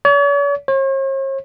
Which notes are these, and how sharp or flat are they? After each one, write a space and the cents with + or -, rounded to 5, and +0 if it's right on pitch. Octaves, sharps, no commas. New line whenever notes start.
C#5 +45
C#5 -45